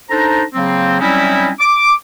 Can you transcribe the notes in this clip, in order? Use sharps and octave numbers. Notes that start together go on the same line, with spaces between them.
D4 D#4 A4 C5 A#5
C#3 F#3 A#3 C4
F#3 G3 C4 C#4 D#4 E4
D6